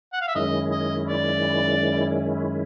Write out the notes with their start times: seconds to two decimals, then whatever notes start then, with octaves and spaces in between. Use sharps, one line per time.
0.13 F#5
0.21 F5
0.28 E5
0.35 F#2 D#3 G#3 C#4 E4 D#5
0.71 D#5
1.07 D5